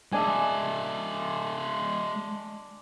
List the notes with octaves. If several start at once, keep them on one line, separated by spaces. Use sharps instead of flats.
G#3 D4 E5 G#5